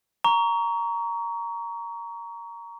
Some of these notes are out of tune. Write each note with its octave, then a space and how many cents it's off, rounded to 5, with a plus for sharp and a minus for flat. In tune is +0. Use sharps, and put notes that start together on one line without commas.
A#5 +0 C#6 +25